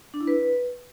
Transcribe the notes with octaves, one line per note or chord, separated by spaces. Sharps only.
D4
E4
B4